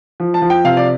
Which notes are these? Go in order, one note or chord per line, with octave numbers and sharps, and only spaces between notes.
F3
A5
F3
G5
C3 F5
D5